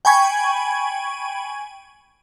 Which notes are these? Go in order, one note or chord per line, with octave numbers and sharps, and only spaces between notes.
G5 G#5 B5 C#6 G#6